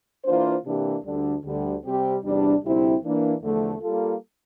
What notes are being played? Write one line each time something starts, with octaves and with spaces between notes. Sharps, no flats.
E3 A#3 D4 F4 C5
C3 E3 A#3 D4 G4
D2 D3 G3 D4
D2 D3 G3
C3 G3 C4 G4
E2 C3 G3 D4
D2 C3 G3 C4 E4
E3 A#3 D4
E2 D3 F3 A3
G3 A#3 F4 A4